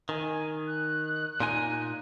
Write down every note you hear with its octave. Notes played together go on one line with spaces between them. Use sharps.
D#3 G#5
F#6
A#2 D#4 G#5